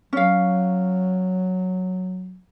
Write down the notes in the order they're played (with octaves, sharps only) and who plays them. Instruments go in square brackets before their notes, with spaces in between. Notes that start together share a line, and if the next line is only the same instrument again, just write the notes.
[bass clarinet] F#3 [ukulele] C#4 F5